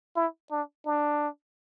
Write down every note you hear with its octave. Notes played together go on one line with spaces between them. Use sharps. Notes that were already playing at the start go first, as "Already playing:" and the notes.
E4
D4
D4